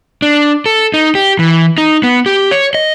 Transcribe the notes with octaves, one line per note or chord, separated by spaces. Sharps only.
D4
A4
D#4
G4
E3
D#4
B3
G4
C#5
D#5